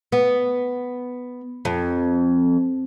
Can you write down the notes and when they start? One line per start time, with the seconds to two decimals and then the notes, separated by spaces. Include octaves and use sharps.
0.12 B3
1.65 F2